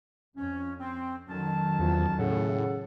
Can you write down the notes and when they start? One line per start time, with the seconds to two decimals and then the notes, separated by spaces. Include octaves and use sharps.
0.37 F2 C#4
0.79 C4
1.29 F2 D#3 F#3 C#4 A5
1.79 E2 F3
2.19 A2 C#3 G#4 A4 F#5